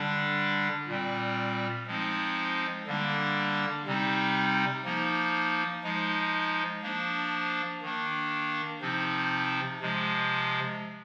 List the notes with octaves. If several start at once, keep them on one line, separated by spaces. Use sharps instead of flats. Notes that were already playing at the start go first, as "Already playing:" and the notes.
Already playing: D3 G3 D4
A#2 G3 C4
F3 G#3 C4 D#4
D3 G3 A#3 D4
C3 G3 C4 D#4
F3 A#3 D#4
F3 G#3 D#4
F3 A#3 D4
D#3 A#3 D4
C3 F3 C4 D#4
C3 F3 G#3